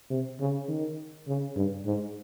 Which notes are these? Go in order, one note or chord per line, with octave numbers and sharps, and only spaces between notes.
C3
C#3
D#3
C#3
G2
G#2